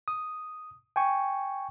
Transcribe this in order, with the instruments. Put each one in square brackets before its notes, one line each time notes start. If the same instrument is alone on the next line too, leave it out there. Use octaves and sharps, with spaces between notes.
[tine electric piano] D#6
G5 G#5 C#6